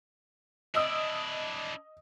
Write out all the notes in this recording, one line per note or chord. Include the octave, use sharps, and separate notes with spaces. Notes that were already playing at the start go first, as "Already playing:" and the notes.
D4 E4 D#5 D#6 E6